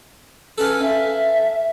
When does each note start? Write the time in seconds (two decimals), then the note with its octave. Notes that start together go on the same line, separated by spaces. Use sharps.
0.58 C#4 A4 B4 F5
0.82 E5